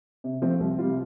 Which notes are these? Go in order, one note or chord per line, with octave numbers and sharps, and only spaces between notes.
C3
F3 A3 C4
C2
C3 G3 F4